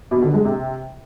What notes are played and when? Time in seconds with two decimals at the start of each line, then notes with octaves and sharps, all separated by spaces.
0.11 B2
0.22 D3
0.33 G#3
0.45 C3